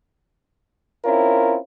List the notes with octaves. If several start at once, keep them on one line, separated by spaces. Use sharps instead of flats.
C4 C#4 E4 F4 A#4